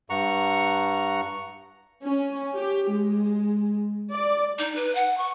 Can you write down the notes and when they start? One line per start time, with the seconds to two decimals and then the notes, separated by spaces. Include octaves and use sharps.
0.10 G2 F#5 A#5 C#6
2.03 C#4
2.56 G4
2.91 G#3
4.12 D5
4.59 D#4
4.76 B4
4.95 F#5
5.18 C#6